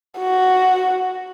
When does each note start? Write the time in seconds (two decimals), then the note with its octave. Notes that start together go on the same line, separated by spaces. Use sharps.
0.18 F#4